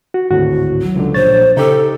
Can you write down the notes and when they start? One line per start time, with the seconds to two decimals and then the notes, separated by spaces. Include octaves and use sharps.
0.14 F#4
0.31 G#1 D2 A2 F#4
0.82 F#3
0.95 C#2 D3
1.14 A#1 C5 C#5 A6
1.57 C#3 D#4 G4 A4